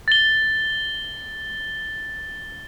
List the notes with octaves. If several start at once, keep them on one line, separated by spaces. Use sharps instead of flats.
A6 G7